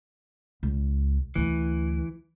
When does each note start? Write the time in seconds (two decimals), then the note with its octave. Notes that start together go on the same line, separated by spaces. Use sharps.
0.63 C#2
1.36 D2 D3 E3